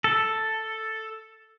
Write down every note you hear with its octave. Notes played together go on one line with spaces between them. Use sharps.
A4